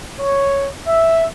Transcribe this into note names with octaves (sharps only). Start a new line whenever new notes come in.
C#5
E5